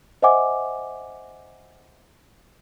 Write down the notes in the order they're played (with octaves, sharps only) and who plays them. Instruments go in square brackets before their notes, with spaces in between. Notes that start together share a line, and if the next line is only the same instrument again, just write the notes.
[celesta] C5 D#5 E5 F#5 G#5 D6